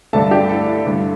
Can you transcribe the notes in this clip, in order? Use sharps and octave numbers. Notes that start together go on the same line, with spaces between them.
G2 D3 A3 E5 A5
D4 G4
E4 A4
E4
G2 D3 A3